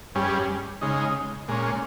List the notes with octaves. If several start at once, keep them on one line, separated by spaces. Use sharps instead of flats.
G2 G3 C#4 G#4
C#3 G#3 D#4
A#2 G#3 C#4